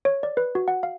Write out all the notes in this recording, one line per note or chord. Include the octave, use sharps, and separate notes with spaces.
C#5
D5
B4
F#4
F#5
F5